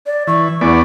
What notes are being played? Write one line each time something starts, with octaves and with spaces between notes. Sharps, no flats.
D5
E3 C#6
E2 E3 B3 D5